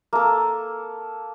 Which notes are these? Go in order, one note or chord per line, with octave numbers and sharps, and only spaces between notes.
A#3 A4